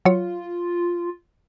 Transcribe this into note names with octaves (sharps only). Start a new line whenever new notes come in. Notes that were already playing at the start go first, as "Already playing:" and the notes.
F#3 F4 C#5